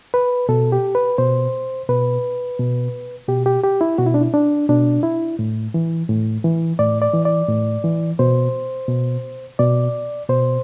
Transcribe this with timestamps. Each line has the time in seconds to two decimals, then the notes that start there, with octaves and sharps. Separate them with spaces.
0.14 B4
0.49 B2 A4
0.72 G4
0.95 B4
1.18 B2 C5
1.89 B2 B4
2.59 B2
3.28 B2 G4
3.46 G4
3.64 G4
3.81 E4
3.98 B2 F#4
4.06 E4
4.14 D4
4.21 E4
4.34 D4
4.69 B2 D4
5.03 E4
5.39 A2
5.74 E3
6.09 A2
6.44 E3
6.79 A2 D5
7.02 D5
7.14 E3
7.25 D5
7.48 A2
7.84 E3
8.19 B2 C5
8.88 B2
9.59 B2 D5
10.29 B2 C5